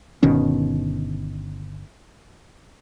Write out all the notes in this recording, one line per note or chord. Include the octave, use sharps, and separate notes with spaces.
G1 B2 D#3 C#4